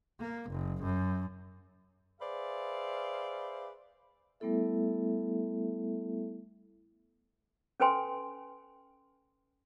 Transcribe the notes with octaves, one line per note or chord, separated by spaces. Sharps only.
A#3
F#1
F#2
G#4 B4 C5 D5 E5 F5
G3 A3 B3 E4 A4 E5
C#4 A4 B4 G5 G#5 C6